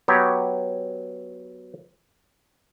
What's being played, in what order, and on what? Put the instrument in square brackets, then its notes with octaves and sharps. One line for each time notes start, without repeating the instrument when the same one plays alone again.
[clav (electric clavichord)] F#3 B3 G4 C#5